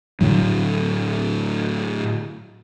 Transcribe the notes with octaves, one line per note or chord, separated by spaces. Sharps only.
A2 D3 F#3